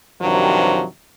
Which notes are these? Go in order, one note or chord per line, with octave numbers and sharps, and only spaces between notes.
G2 C3 D#3 F3 F#3